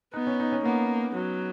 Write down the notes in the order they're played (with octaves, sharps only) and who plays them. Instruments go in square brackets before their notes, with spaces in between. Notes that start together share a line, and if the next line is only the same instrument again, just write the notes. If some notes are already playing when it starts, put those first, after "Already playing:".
[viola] B3 [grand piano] D#4
[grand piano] C#4
D#4
C#4
[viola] A#3 [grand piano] B3
[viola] F#3